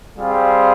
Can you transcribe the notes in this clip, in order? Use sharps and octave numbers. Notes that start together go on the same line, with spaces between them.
G3 C4 F4 G#4